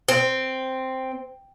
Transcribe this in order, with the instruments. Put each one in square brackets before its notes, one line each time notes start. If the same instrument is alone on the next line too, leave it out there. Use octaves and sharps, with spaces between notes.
[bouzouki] C4